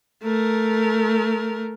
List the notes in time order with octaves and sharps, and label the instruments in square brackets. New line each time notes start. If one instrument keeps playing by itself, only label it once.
[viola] A3 A#4